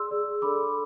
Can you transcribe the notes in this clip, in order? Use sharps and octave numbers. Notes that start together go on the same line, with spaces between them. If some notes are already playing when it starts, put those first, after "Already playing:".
Already playing: G#4 D5 C6 E6
G#4 D5
D4 A4 D5 B5 D6